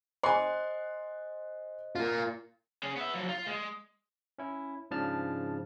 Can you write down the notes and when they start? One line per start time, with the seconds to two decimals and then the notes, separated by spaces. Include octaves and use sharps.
0.23 C5 D#5 G#5 C6
1.95 A#3 F4
2.83 C#4 G#4
2.96 B3 E5
3.14 F3 F#3
3.29 F4
3.47 G#3
4.38 C#4 E4
4.91 G#2 C#3 F3 D4 A5 F6